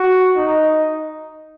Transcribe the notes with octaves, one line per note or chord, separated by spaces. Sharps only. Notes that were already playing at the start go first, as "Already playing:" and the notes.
Already playing: F#4
D#4